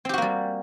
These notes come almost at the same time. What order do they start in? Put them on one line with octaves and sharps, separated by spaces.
C4 G4 F#4 A#3 G3